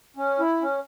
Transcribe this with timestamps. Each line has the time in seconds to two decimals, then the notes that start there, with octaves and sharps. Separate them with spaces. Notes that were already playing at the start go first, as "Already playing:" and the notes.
0.17 C#4
0.39 E4
0.62 C#4